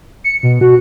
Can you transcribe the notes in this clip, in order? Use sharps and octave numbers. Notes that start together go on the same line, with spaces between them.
C#7
B2
F#4